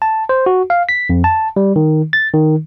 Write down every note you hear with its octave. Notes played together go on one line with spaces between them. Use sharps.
A5
C5
F#4
F5
B6
F2
A5
G3
D#3
A6
D#3